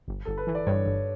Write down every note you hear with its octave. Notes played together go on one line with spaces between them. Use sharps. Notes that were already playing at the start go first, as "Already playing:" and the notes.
G1
G1 A4
B4
E3
D5
G2 C#5
G1